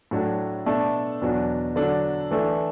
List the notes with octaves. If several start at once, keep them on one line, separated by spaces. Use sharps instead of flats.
A2 F#3 D4 A4
B2 A3 D4 A4
E2 B2 F#3 D4
D3 F#3 D4 A4
E3 A3 D4 A4